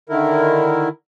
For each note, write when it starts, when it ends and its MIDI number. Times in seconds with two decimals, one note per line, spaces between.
0.09 0.89 50
0.09 0.89 51
0.09 0.89 64
0.09 0.89 70